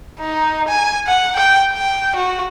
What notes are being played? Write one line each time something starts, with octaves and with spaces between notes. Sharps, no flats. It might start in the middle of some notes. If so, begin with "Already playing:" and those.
D#4
G#5
F#5
G5
G5
F#4